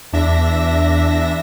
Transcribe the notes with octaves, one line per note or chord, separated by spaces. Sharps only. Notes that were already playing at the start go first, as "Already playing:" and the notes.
E2 D4 E5 A#6